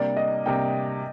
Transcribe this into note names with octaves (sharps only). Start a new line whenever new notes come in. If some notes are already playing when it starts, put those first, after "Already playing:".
Already playing: C3 G3 A#3 D4 D5
D#5
C3 G3 A#3 D4 G5